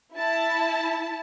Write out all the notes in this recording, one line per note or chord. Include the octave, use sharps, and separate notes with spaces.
E4 A5